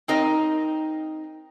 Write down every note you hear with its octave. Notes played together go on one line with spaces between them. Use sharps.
C4 D#4 A#4 D#5